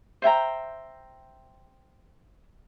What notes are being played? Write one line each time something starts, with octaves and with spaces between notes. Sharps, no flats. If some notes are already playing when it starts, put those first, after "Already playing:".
C5 E5 G5 A#5